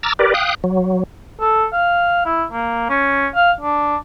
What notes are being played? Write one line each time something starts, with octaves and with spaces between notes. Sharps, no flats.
A#5 D6 E6 F6 A6
G4 A#4 B4 D5
F5 G5 D#6 F#6
F#3
A4
F5
E4
A#3
C#4
F5
D4